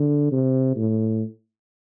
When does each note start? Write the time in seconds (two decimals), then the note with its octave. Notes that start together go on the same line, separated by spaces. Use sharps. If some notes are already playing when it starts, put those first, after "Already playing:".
Already playing: D3
0.32 C3
0.76 A2